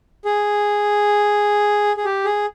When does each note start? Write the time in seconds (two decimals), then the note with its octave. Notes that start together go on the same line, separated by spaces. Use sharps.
0.25 G#4
1.97 G#4
2.05 G4
2.25 G#4